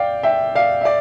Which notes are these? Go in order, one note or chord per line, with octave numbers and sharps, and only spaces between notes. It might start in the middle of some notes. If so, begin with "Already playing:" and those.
Already playing: D5 F5 G5
E5 G5
D5 F5
E5
D5